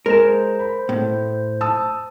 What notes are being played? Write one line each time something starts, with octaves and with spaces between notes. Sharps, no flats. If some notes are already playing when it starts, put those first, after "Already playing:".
G#3 A#4 C5 E7
B5
A2
A5 D#6 E6